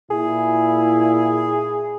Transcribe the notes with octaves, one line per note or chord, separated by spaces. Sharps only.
A#2 E4 G#4